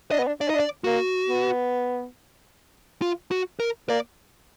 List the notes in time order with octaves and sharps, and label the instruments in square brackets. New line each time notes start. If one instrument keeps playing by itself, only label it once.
[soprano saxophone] D4 [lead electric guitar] D#5
[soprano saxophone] B3
D4
[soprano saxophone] D4 [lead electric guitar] D5
[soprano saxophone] D#4 [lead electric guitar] D#5
[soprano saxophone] D4
[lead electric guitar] D5
[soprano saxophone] A#3 [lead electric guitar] F#4
[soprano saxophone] B3
[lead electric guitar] F4
F#4
A#4
[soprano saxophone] A#3 [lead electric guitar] D5